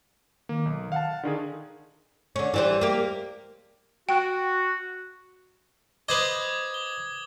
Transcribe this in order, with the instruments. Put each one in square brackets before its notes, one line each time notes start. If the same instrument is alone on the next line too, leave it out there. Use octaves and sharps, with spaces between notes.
[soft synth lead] D#3 [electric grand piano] A#3
[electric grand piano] B1
[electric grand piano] F5 A5 [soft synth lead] F#5
[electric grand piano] D3 D#3 G#4 [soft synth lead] D4
[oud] D3 C#4
E3 G3 C5
A#3 G4
[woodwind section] F#4 [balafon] G5
[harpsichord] B4 C5 D#5 [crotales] D6 D#6 G#6
[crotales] G7